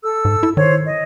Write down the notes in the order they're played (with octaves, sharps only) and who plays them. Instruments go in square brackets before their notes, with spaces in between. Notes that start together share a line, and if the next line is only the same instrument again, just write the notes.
[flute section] A4 E6
[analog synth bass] G#2
E4
[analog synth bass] D#3 [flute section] C5 C#5
[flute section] D#5